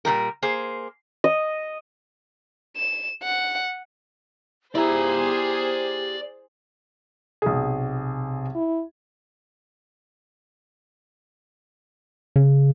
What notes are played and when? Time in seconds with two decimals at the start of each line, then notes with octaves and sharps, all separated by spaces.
0.05 A#2 E3 G3 A#4
0.42 A#3 G#4 C5
1.24 D#5
2.77 E7
3.23 F#5
4.75 E4 G4 G#4 C5 D5 A#5
7.42 B1 C3 G#4
8.55 E4
12.36 C#3